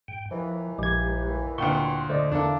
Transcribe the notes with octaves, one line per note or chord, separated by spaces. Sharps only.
G#2 G5
D#2 E3 F3
A#1 G#3 G4 G#6
D2 A#2 G5 C6 C#6
D3 A3 C5 D5 D#5
E2 A#3 D4 E4 A4